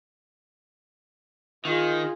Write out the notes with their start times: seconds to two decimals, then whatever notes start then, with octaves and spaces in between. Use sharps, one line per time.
1.65 D#3 F4 G#4